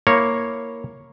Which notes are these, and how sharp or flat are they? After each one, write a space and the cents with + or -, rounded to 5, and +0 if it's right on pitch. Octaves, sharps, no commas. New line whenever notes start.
A#3 -5 E4 +0 C#5 -5